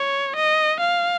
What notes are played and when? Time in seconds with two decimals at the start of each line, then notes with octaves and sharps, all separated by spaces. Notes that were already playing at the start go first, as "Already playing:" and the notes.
Already playing: C#5
0.36 D#5
0.80 F5